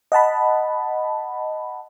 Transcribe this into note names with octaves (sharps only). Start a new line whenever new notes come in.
D#5 F#5 A5 B5